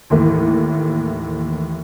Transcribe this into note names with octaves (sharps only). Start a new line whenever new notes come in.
D#2 A2 E3